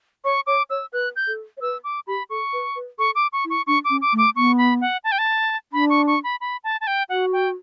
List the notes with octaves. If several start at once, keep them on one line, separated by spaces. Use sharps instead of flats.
C#5 C#6
C#5 D6
C#5 E6
B4 F#6
G6
A4
C#5
B4 E6
D6
G4 B5
A4 C#6
B4
B4
A4 C#6
D6
C#6
E4
C#6
D4 C#6
D6
C#4
D6
A3
D6
B3 C#6
B5
F#5
A5
G5
A5
D4 B5
C#6
C#6
B5
B5
A5
A5
G5
F#4 F#5
G5